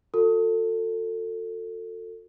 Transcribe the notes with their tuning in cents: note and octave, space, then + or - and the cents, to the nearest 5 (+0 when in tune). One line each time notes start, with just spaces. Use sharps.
F#4 -40 A4 +25